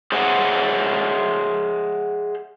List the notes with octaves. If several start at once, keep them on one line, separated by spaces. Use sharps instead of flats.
G#4 C5 C#5 D#5 E5 F#5